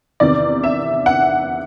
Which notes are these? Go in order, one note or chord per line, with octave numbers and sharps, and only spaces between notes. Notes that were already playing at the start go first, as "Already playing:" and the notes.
E2 C3 D#3 D5
E5
F#5